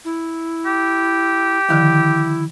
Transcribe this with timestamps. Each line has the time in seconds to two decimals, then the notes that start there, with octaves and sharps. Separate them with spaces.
0.05 E4
0.66 G4
1.69 D3 D#3 F3 E4